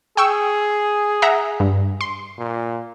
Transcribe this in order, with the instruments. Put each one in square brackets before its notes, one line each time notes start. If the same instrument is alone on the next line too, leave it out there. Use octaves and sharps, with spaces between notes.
[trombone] G#4 [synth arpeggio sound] G5 C#6 E6
[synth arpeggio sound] E5 F#5 A#5
G2
C6
[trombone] A#2